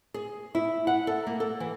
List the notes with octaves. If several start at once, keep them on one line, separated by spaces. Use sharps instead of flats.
G#4
E4
F#5
A4
A#3
A4
E3